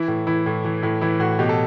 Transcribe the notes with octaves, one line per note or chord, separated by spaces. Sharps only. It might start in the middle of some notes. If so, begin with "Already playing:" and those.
Already playing: E3 E4
A2
E3 E4
A2
E3
A2 E4
E3 E4
A2 F#4
B2 G4
A4